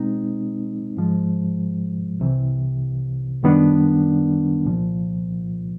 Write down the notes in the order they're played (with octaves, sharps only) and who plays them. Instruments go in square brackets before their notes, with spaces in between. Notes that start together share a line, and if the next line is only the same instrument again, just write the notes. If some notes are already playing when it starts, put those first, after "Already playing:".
Already playing: [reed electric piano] B2 G#3 C4 D#4
G#2 F3 G#3
C2 C3 E3
F#2 D#3 G3 B3 D4
C2 A#2 F3